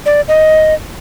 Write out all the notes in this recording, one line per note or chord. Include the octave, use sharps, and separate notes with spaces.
D5
D#5